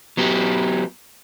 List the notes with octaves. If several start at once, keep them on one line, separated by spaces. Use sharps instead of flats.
F#3 B3 G4